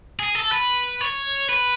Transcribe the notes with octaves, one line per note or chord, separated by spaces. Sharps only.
G#4
A4
B4
C#5
B4